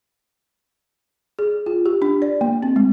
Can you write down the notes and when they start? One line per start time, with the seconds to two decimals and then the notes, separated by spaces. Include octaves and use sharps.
1.39 G#4
1.66 F4
1.86 G4
2.02 D4
2.22 D5
2.41 A#3
2.63 C4
2.76 G#3